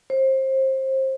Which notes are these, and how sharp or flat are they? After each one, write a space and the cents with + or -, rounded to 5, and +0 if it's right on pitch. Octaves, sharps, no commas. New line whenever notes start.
C5 +25